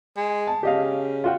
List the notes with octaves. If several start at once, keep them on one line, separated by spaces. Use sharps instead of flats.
G#3
A5
C#3 G4 D#5 F5
F4 F#4 G5